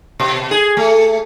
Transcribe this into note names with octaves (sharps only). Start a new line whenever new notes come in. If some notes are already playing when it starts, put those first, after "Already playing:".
B2
G#4
A3